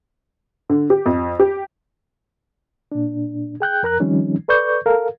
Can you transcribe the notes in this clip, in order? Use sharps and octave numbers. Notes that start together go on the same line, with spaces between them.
D3
G4
F2
G4
A#2 D4
G#4 G5 F#6 G6
F2 A#4 A#5 F#6
D#3 F3 G3 C4 C#4 D#4
A4 B4 D5 C#6 G6
A4 A#4 F5